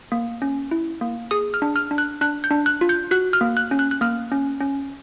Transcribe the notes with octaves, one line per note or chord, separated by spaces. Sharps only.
A#3
C#4
E4
A#3
G#4 D#6
F6
D4
F6
D4
F#6
D4 F#6
G6
D4
F#6
F4
G6
F#4 F#6
F6
A#3
F#6
C#4
F#6
F#6
A#3 F6
C#4
C#4